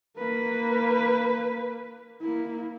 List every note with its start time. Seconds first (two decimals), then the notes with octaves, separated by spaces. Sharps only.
0.18 A#3 B4
2.22 A#3 E4